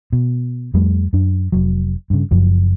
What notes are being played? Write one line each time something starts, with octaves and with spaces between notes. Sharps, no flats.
B2
F2 F3 G3 A3
F#2 D4
F1 F#3
G2 C#3
F#1 F#2 F3 F#3